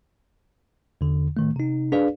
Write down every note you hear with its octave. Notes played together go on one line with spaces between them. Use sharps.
E2 D3
A2 D#3 A3
C3 D#4
D4 G#4 B4 D5 F5